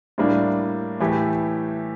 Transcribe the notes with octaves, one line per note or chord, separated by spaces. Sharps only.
A2 G3 A#3 D4
A2 E3 A3 E4 G4